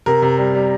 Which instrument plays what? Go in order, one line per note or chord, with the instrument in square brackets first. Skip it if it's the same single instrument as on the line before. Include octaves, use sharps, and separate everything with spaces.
[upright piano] C3 A#4
C3
G3
G3